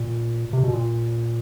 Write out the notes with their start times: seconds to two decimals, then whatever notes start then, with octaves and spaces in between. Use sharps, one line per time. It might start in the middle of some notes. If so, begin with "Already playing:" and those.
Already playing: A#2
0.53 C3
0.63 B2
0.73 A#2